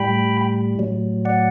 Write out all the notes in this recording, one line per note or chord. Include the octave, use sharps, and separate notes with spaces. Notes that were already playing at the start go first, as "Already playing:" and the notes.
Already playing: A2 G3 G5 B5
A2 F#3
D5 F#5